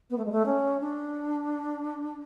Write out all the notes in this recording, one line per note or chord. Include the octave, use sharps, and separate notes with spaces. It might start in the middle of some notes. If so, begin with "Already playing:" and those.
B3
A3
G#3
A3
C#4
D4